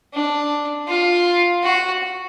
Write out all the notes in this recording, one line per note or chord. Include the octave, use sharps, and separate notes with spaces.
D4
F4
F#4